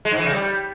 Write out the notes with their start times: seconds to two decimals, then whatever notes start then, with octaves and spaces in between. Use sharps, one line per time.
0.05 G#3
0.12 G#2
0.18 E3
0.25 C#3
0.31 G3